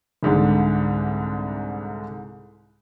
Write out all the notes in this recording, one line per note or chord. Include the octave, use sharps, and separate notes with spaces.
C2 G#2 D3